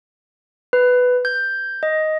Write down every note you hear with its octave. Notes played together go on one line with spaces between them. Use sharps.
B4
G6
D#5